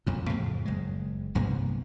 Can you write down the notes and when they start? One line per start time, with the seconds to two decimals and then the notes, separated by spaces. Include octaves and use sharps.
0.07 A1 F2 A#2
0.29 F2 A2 C#3 F3
0.66 F#1 G#3
1.35 B1 G2 C3 A#3